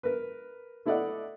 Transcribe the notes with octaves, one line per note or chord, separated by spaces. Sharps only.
A#4 B4
A3 E4 A4 D5 D#5 F#5